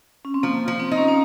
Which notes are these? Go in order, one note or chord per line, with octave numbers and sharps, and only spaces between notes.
C#4
C4
F3 A#3
F3
C4
D#4
C#4
C#4